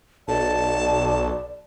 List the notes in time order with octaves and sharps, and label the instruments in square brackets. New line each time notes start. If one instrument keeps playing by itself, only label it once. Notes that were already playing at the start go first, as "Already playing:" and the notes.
[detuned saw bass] B1 [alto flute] D5 [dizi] A5